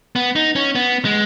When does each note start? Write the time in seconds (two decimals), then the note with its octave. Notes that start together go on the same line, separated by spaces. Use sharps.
0.16 B3
0.35 D#4
0.56 C#4
0.75 B3
1.05 G#3